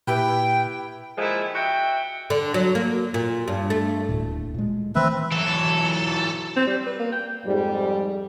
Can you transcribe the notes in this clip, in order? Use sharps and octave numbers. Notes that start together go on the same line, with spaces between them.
A#2 E4 G4 B4 G5
A#2 D#3 F3 G#3 E4
F#4 E5 G5
D3
F#3
A#3
A#2
G2
A3
D#1 D2 A2
A#2 G#3
D#3 E3 A3 C4 B4 E5
E3 F#3 A4
C4
G3
B4
A#3
G5
F2 G#2 G3